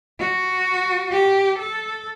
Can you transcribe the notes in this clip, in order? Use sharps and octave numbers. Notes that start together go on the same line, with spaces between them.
F#4
G4
A4